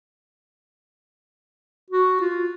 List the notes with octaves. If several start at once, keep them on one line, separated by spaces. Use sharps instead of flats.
F#4
F4